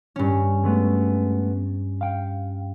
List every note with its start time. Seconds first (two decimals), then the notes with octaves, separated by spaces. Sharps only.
0.16 G2 C#4
0.64 G#3 A3 B3
2.01 F5 G5